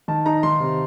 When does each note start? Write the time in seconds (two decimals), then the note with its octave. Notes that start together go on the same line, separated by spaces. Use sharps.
0.08 D#3 A5
0.26 D#4 A#5
0.43 D#3 C6
0.60 C3